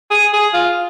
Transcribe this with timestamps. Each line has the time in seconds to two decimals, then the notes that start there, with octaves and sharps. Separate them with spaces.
0.10 G#4
0.33 G#4
0.54 F4